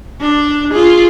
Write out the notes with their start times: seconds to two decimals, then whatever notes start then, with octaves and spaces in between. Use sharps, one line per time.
0.21 D4
0.72 F4 G#4